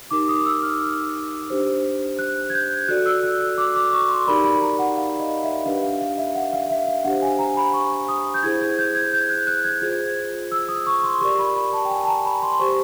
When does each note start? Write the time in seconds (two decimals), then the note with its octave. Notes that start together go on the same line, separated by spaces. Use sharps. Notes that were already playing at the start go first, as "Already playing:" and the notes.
0.11 D#4 G4 A#4 D6
0.28 D#6
0.40 D#6
0.46 E6
0.63 F6
1.50 D4 G4 C5
2.19 F#6
2.50 G#6
2.54 G6
2.88 F#4 A4 D5 F#6
3.06 E6
3.23 F#6
3.40 E6
3.58 D6
3.76 D6
3.93 C#6
4.09 C6
4.27 D#4 G4 A#4 D5 B5
4.44 B5
4.54 B5
4.61 A#5
4.79 F#5
4.97 F5
5.19 D#5
5.43 E5
5.65 D4 G4 B4 F5
5.83 F5
6.01 F5
6.18 E5
6.35 F#5
6.53 F5
6.70 E5
6.88 F5
7.04 D4 G4 C5 F#5
7.22 G#5
7.39 A#5
7.57 B5
7.73 C#6
8.08 D#6
8.34 G6
8.43 E4 G#4 C5 G#6
8.61 G#6
8.78 G6
8.95 G#6
9.13 G6
9.30 F#6
9.47 F#6
9.65 G#6
9.81 F4 G#4 C5 G#6
10.52 E6
10.68 D#6
10.87 C#6
11.03 C6
11.21 G4 A#4 D5 C#6
11.38 B5
11.56 B5
11.73 A5
11.85 G5
11.90 G#5
12.03 A5
12.07 A#5
12.25 B5
12.42 C6
12.60 G4 C5 C#6